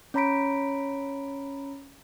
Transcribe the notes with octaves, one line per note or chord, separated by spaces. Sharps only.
C#4 C#5 A#5 B5 B6 D7